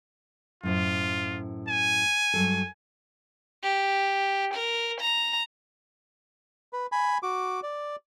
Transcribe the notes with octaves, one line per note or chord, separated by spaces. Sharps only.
F#2 A2 F4 C5
G#5
G2 F#3 A4
G4
A#4
A#5
B4
G#5 B5
F#4 D6
D5